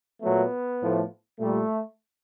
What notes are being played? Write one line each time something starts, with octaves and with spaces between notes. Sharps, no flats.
A#2 F#3 A3 B3
A2 F3 A3
A#2 G3 A3